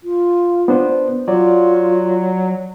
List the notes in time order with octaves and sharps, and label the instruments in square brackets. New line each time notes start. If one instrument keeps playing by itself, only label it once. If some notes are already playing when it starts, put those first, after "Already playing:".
[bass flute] F4
[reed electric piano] B3 D4 C5
[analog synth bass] F#3 [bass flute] F4 [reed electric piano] D5